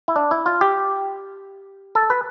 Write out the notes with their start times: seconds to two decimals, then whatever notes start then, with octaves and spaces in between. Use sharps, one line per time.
0.08 E4
0.16 D4
0.31 E4
0.46 F4
0.61 G4
1.95 A4
2.10 B4